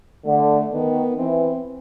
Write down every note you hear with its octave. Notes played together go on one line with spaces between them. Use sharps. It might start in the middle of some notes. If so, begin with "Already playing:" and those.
D3 A3
D#3 B3
E3 C4